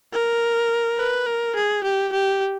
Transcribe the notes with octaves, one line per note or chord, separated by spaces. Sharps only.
A#4
B4
A#4
G#4
G4
G4